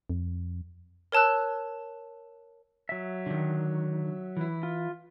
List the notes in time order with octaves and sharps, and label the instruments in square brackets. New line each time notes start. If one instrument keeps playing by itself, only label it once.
[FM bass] F2
[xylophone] A#4 C#5 A5 E6 F#6
[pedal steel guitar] F#3 E5
[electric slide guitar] D3 D#3
E3 E4
[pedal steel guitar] F4